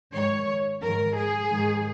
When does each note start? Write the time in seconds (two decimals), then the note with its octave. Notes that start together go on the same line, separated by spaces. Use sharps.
0.13 G#2 D#3 C#5
0.82 G#2 D#3 A#4
1.17 G#4
1.50 G#2 D#3